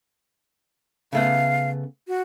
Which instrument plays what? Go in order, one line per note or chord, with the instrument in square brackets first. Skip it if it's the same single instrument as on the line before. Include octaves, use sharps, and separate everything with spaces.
[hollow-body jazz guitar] C#3 A3 B3 [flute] F5
[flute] F#4